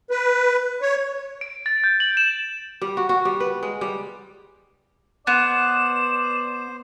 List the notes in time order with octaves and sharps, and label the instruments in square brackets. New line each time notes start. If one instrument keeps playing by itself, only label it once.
[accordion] B4
C#5
[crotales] D7
A6
G6
F#7
E7
[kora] G3
F#4
F#4
G3
B4
G#3
G3
[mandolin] B3 [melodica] C5 [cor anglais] D5 [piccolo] E7